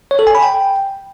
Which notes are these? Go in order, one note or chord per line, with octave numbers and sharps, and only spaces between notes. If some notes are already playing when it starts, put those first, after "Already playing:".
C#5
A4
G#5
B5
G5